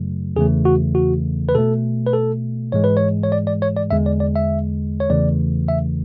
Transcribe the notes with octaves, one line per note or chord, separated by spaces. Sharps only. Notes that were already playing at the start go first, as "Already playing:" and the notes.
Already playing: F#2 C#3 F#3 A3
E2 C#3 E3 A3 G#4
F#4
F#4
B4
B2 A3 A4
B4
A4
G#2 E3 G#3 C#5
B4
C#5
C#5
D5
D5
C#5
D5
E2 D3 G#3 E5
D5
D5
E5
C#5
E2 C#3 E3 A3 D5
E5